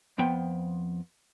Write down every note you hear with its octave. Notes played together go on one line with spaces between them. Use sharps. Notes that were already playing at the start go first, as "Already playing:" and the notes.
F2 F3 B3 G5